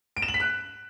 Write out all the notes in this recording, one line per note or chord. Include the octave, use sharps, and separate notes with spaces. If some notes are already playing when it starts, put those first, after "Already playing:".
D7
E7
F#7
B6
F#6